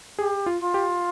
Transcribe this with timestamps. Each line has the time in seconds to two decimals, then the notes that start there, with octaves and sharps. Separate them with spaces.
0.18 G4 G#4
0.46 F4
0.60 F4
0.74 G4